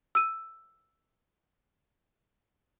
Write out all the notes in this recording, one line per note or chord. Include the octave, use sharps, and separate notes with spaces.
E6 D#7